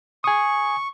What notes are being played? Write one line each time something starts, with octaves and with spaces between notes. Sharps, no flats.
G#5 C#6 D#6